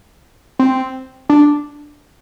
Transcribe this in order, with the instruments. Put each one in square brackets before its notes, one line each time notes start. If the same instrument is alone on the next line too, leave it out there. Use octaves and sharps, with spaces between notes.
[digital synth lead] C4
D4